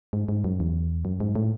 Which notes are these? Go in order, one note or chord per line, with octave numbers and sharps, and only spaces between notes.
G#2
G#2
F#2
E2
F#2
G#2
A2